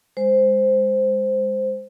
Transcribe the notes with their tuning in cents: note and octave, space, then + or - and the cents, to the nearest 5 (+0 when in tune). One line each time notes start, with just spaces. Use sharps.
G#3 -20 C5 -5